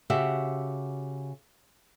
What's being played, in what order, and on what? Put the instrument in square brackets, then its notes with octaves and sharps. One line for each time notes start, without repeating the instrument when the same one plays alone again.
[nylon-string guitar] C#3 F#4 G4 E5 F#5